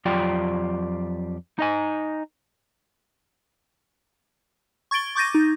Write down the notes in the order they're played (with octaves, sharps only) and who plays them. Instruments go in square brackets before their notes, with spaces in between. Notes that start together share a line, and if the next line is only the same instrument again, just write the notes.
[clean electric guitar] F2 F#3 F4 G4 D5 G5
D#4 D#5 G#5
[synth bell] C#6 G#6 A6 D7 G7
C#6 D6 G6 A6 A#6 D#7
D#4